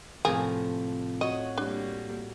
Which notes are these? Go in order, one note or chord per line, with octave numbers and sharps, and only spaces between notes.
A2 C3 F3 A#3 G#4
F#4 C#5 D#5
G3 A#3 D4